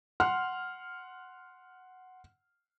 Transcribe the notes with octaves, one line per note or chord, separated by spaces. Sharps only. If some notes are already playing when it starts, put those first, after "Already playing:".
F#5 C6 F6